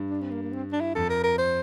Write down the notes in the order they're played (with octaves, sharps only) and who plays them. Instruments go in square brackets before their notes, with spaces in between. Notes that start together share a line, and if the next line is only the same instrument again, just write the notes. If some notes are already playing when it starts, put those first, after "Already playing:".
Already playing: [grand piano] G2
[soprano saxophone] D4
C4
A#3
A#3
C4
D4
E4
[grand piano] F2 [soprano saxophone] A4
[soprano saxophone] A#4
A#4
C5